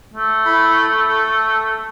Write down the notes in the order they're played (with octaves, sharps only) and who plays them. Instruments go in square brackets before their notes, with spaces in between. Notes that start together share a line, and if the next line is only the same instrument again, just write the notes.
[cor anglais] A3
[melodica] E4 A4 B5
A4